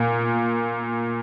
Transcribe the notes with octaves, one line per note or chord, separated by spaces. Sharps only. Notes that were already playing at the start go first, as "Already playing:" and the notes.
Already playing: A#2